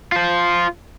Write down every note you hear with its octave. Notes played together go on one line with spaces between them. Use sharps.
F4 C5